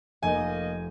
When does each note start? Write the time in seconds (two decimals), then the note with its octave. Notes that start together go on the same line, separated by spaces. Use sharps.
0.23 F1 A#3 D#5 G#5 G6